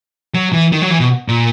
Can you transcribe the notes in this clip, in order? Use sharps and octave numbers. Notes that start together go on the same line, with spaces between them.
F#3
E3
D#3
F#3
E3
B2
A#2